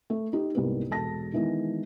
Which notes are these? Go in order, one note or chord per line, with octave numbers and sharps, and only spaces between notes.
A3
D#4 G4
C2 G#2 A#3 B3 B4
E1 A4 A5 A#6
D#3 E3 G#3 B3